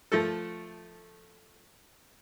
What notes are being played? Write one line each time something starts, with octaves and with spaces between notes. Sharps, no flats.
F3 A3 A4